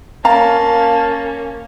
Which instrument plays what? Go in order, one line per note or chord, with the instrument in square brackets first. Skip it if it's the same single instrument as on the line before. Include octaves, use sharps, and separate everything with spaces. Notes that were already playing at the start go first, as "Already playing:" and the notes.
[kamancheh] A#3 C#4 [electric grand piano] F5 [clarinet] A5 [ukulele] A#5